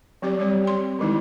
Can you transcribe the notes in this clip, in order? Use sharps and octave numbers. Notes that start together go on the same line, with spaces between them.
F#3 C4 G4 D5
G3 G4 C#5
C4 C6
D#3 E3 G#3 D#4 E4